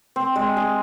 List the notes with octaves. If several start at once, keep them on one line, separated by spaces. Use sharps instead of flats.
C4
G#3
G#4